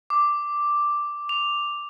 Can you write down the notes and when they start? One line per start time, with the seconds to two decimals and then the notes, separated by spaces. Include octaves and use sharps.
0.10 D6
1.29 F7